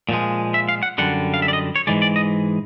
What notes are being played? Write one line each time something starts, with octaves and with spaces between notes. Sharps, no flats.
A#2 F3 G#3
E5
F5
F#5
F#2 D3 G3 F#5
F5
E5
D5
D#5
C#5
G#2 E3 G#3 D5
D5
D#5